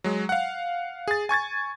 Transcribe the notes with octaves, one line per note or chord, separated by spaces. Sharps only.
F#3 G#3
F5 F#5
G#4 A6
G#5 C#6 G#6 A6